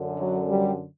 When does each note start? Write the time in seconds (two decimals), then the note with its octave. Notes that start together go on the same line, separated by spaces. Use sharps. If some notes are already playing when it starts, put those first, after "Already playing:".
Already playing: F#2 D3
0.20 F#3
0.50 G3